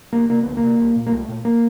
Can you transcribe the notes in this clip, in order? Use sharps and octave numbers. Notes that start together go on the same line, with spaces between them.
D2 A#3
C3 A#3
D2 B3
A#3
C3
C2
A#2
A#3
C2 A3
A#2
A#3